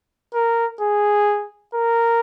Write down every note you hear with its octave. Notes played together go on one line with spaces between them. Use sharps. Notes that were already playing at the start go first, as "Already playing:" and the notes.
A#4
G#4
A#4